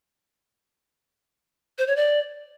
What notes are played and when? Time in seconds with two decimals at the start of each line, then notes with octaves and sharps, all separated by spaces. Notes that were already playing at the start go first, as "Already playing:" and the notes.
1.78 C5
1.87 C#5
1.96 D5